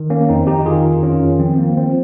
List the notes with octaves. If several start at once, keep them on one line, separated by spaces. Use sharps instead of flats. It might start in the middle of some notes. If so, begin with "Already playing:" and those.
Already playing: D#3
A#3 C#4
F2 C4 D#4
D#4 G4
D#3 F4 G#4
D#3 C#4 F4
F3 C4
A#3
F3 C4